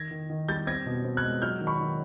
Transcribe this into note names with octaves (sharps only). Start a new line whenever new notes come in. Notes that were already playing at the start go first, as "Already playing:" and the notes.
Already playing: D#3 G#6 A#6
D#3
D#3
G3 G6 A6
C4 G#6 A#6
B2
C4
F#6 G#6
G#3
F#3 F6 G6
D#3
B5 C#6
D#3